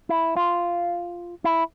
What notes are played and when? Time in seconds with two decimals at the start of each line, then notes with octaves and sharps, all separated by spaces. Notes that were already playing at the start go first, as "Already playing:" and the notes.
0.09 E4
0.36 F4
1.44 E4